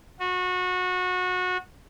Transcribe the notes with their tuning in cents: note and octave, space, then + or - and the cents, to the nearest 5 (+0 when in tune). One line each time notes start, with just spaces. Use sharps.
F#4 -25